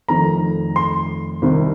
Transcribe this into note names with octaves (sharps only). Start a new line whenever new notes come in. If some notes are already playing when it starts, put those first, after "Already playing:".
F1 F2 D#3 A#5
C6
C2 C3 D#3